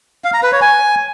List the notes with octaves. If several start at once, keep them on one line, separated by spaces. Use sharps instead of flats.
F5
A#5
B4
C#5
G#5